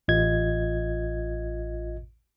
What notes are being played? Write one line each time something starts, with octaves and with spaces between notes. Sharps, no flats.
A1 F4 D#5 G#6